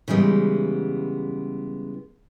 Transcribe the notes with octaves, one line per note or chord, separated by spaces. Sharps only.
C#3 E3 G3 G#3 B3